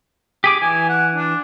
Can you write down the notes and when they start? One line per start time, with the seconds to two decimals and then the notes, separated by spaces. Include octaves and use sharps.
0.44 G4 G#4 D6
0.62 E3 G#5
0.89 F#5
1.16 D4